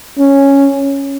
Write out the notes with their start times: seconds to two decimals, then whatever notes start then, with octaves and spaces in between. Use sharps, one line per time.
0.18 C#4